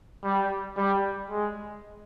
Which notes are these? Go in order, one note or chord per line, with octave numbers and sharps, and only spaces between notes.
G3
G3
G#3